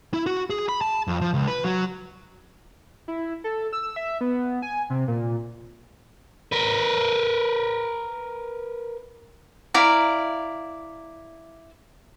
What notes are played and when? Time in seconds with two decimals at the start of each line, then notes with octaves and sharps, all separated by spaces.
0.14 E4
0.26 F#4
0.50 G#4
0.69 B5
0.81 A5
1.08 F2
1.21 F3
1.34 C#2
1.48 B4
1.65 F#3
3.08 E4
3.44 A4
3.73 E6
3.96 E5
4.21 B3
4.62 G#5
4.90 C3
5.08 A#2
6.52 A#4 B4
9.74 E4 D5 F5 A#5